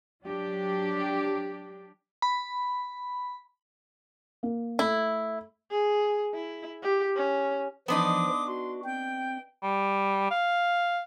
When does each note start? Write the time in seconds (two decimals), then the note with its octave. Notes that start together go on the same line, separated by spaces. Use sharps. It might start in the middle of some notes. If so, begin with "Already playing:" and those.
0.24 F#3 D4 G4
2.22 B5
4.43 A#3
4.79 A3 E4
5.71 G#4
6.34 E4
6.83 G4
7.16 C#4
7.88 E3 F3 B3 D4 D#4 C6 D6 D#6
8.47 F#4 C6
8.84 C4 G5 G6
9.63 G3
10.31 F5